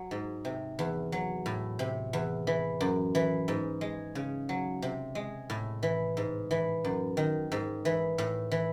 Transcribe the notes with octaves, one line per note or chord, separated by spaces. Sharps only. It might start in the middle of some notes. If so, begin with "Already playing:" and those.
Already playing: F#3
G#2
C3
E2
F#3
A2
C3
E2
E3
F#2
E3
G#2
G#3
C#3
F#3
C3
G#3
A2
E3
G#2
E3
F#2
D#3
G#2
E3
A2
E3